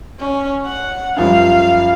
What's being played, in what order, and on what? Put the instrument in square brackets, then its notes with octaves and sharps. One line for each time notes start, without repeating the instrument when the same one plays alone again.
[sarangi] C#4
F#5
[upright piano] F#2 F3 G3 [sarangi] F5